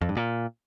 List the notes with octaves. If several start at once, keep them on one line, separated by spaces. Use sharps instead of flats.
F2
G2
A#2